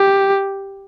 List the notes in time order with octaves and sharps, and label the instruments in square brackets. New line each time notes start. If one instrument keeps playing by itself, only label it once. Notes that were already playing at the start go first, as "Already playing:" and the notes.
Already playing: [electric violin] G4